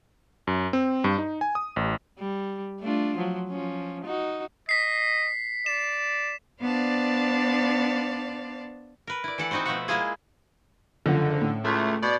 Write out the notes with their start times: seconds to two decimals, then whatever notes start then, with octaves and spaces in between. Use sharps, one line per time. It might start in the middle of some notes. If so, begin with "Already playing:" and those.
0.47 F#2
0.73 C4
1.04 G2
1.18 D#4
1.41 G#5
1.55 D#6
1.76 A1
2.19 G3
2.80 A3 D4 F4
3.17 F3 F#3
3.49 F3 C#4
4.05 D#4 F#4
4.69 D#5 B6 C7
5.66 D5 E7
6.61 B3 D4 C5 D5 F5 A5
9.07 A#4 B4
9.24 E4 D5
9.38 E3 A4 F#5
9.51 C4 D#4 F#4 B4 C5
9.65 B2 F3 A3 F4 E5 F#5
9.88 G#3 A#3 E4 F4 G#4
11.06 F#1 D3 F3 F#5
11.41 A2
11.64 C#2 A3
12.03 B2 D5